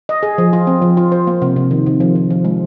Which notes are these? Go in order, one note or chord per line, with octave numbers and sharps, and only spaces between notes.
D#5
G#4
F3
F4
C4
F3
F4
C5
A#3
C3
C3
D#3
C3
F3
F3
F3
G#3